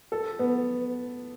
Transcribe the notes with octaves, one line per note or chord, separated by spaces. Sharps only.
A4
B3